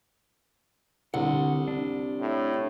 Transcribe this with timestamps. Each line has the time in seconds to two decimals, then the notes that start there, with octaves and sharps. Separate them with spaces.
1.14 C2 D3 F#5
1.68 D4
2.21 A2